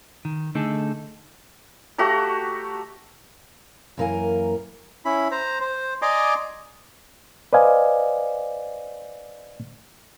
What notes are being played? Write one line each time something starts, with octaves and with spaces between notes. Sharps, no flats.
D#3
D3 A3 D#4 G#4 A4
A3 F#4 G4 A#5
F#2 E3 A#3 A#4 F5 G#5
C#4 E4 B5
C5 A#5
C5
D5 D#5 G#5 A#5 C6 D6
B4 C5 D5 D#5 F5 G#5